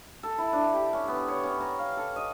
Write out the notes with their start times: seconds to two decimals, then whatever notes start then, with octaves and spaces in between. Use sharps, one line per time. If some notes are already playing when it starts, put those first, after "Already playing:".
0.23 A4
0.38 E4
0.53 D4
0.73 G4
0.93 C#4
1.08 B3
1.28 C#5
1.44 C#4
1.60 A#5
1.79 F5
1.97 A4
2.16 D#5